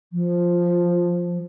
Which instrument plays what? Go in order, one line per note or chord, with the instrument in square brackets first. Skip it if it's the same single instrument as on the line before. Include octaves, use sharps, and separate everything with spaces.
[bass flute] F3